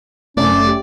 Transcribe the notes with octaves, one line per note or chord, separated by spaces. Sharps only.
F#2 C3 A3 C#4 D5
F#1 A3
G4